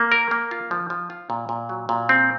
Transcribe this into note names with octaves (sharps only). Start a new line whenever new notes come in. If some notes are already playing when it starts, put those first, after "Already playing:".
Already playing: A#3
A#4
A#3
F4
F3
F3
F4
A#2
A#2
F#3
A#2
C4